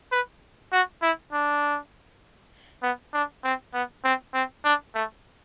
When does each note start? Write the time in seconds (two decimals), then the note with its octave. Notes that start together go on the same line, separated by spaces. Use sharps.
0.12 B4
0.72 F#4
1.02 E4
1.33 D4
2.83 B3
3.14 D4
3.44 C4
3.74 B3
4.04 C4
4.34 C4
4.65 D4
4.95 A3